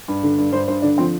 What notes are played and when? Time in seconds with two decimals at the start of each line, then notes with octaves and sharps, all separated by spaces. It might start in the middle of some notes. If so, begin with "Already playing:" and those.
0.08 G2
0.23 D3
0.38 G2
0.52 G2 C5
0.68 G2 C5
0.82 D3 D4
0.98 F3 C4